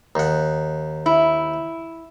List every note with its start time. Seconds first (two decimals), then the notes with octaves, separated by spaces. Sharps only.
0.15 D#2 F#5
1.06 E4